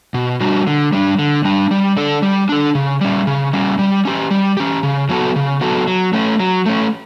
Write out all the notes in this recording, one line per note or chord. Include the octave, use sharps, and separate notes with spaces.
B2
G3 D4 F#4
D3
G3 D4
D3
G3 D4
G3
D4 A4
G3
D4 A4
C#3
G3 C#4
C#3
G3 C#4
G3
C#4 G4
G3
C#4 G4
C#3
F#3 B3 F#4 A4
C#3
F#3 B3 F#4 A4
F#3
A3 C#4
F#3
A3 C#4